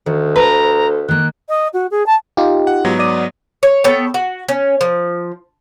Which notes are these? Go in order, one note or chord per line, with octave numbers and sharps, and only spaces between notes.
D2 D#3
A4 B4 C5 A#5
D#3 A#3 F#6
D#5
F#4
G#4
A5
D#4 F4 G4
F#5
G#2 F#3 B3
D5 D#6
C#5
B3 A4 C#5 G5
F#4
C#4
F3